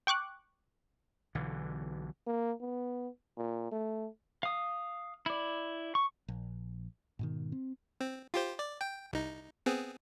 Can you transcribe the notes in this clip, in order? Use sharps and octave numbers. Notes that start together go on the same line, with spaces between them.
G5 C#6 D6 F#6
B1 D3 E3
A#3
B3
A#2
A3
F5 D#6
E4 D5
C#6
A#1
G#2 B2 D#3
C4
C4
F4 G4 C5
D5
G5
C2 D#4
B3 C4 G#4